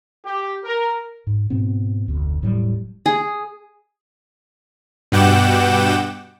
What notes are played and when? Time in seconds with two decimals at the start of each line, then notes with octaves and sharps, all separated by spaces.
0.24 G4
0.64 A#4
1.27 G#2
1.50 G#2 B2 B3 C4
2.08 F1 D2
2.42 E1 A2 F#3 G3
3.06 G#4
5.12 G2 B2 F#5 G5 D6 E7